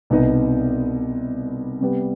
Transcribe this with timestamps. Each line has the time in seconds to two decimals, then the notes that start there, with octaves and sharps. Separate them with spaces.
0.10 C2 B2 B3 D#4
1.81 C3 G3 B3